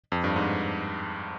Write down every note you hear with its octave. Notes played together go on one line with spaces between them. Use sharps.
F2
G2
G#2